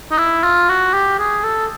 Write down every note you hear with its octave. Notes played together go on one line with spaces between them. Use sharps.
D#4
E4
F4
F#4
G4
G#4
A4